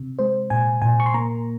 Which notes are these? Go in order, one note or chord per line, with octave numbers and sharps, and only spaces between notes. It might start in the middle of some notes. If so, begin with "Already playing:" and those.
Already playing: C3
G#3 C5
A#2 G#5
A#2 G#5
C#6
C6
A#3 A#5